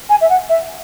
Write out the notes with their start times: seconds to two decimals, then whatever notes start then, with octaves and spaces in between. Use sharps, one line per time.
0.09 G#5
0.21 E5
0.29 F#5
0.49 E5